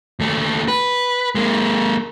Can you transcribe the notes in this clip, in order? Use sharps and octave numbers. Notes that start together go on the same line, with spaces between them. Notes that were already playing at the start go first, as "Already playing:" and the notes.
D#2 A3
B4
G#3 A#3